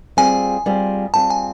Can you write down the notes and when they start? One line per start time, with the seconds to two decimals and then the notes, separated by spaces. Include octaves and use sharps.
0.17 G3 C4 F4 G#4 G#5
0.66 G3 C4 F4 G#4
1.14 G3 C4 F4 G#4 A5
1.30 G#5